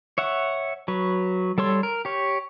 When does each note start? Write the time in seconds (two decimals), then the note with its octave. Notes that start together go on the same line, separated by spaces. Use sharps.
0.18 C#5 E5 F#5
0.88 F#3 B4
1.58 G3 A4 C#5 C6 E6
1.83 A#4
2.05 G4 C#5